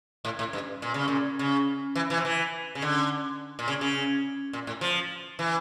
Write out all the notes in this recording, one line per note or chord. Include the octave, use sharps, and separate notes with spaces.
A2
A2
G2
A#2
C#3
A#2
C#3
E3
E3
F3
E3
C#3
D3
A#2
C#3
C#3
A#2
A2
F3
E3